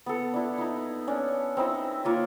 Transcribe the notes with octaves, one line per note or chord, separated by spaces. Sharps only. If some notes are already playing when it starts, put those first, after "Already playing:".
B3 A4
D4 E4
D#4 E4
C#4 D4
C4 D#4 E4
A#3 F4 C#5